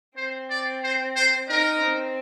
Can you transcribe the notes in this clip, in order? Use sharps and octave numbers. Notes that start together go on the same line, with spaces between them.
C4 C5
D5
C5
C5
D#4 A#4
C4